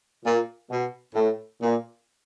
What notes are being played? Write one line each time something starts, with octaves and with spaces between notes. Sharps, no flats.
A#2
B2
A2
A#2